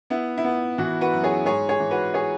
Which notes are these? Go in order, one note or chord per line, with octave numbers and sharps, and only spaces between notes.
B3 E4
E4
B3
E3 F#4
F#4 B4
F#2
G#4 C#5
G#2 G#4 C#5
G#4 C#5
E3
F#4 B4
G#4 C#5